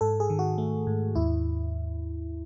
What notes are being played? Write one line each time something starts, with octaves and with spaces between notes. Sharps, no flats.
G#2 A4
G#4
D#3
F#4
A3
G#2
D#2 E4